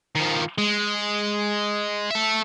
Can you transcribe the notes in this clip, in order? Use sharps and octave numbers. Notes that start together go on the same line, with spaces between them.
D#3 F3
G#3
A4 E5